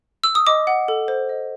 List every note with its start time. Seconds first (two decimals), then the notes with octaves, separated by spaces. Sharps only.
0.24 E6
0.35 D#6
0.47 D#5 D6
0.67 F#5
0.88 A4
1.08 C5
1.29 D#5